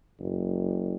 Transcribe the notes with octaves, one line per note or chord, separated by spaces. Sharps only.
F#1